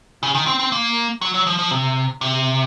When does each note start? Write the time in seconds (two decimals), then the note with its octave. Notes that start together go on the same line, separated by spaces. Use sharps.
0.23 C#3
0.35 D#3
0.47 C4
0.59 C4
0.72 A#3
1.21 F#3
1.34 F#3
1.47 F3
1.59 F3
1.71 C3
2.21 C3